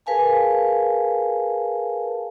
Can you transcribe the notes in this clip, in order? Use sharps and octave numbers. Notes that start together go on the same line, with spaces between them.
G#4 A#4 B4 F5 G#5 A5